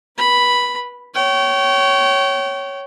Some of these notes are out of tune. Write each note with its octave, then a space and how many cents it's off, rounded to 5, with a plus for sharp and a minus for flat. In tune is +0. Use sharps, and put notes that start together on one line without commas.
B4 -25 B5 +0
C#5 +0 G5 -35